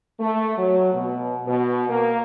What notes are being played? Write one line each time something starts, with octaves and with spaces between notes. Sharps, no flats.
A3
F#3
B2
B2
A#3